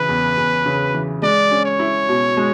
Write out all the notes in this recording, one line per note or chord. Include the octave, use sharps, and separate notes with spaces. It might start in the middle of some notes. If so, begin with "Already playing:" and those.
Already playing: C#3 E3 B4
E2
E2
C#3
E3
G#3 D5
C#4
C#5
E4
B2
G#3